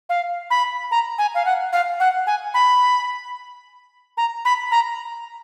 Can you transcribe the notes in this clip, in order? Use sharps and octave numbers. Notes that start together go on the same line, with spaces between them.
F5
B5
A#5
G#5
F5
F#5
F5
F#5
G#5
B5
A#5
B5
A#5